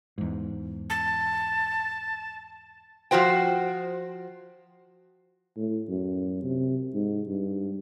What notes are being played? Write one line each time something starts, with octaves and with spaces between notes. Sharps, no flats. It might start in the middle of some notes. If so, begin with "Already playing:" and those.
E2 G#2
A5
F3 F4 F#4 C5 G5
A2
F#2
C3
G#2
G2